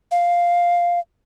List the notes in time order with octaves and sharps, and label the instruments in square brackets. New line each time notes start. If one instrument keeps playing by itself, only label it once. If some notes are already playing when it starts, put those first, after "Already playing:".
[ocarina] F5